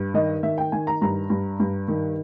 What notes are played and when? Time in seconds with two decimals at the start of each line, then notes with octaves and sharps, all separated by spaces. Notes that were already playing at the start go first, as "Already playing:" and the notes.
Already playing: G2
0.14 D#3 D#5
0.43 D#3 E5
0.58 G5
0.72 D#3 G#5
0.87 A#5
1.01 G2 A#5
1.30 G2
1.60 G2
1.88 D#3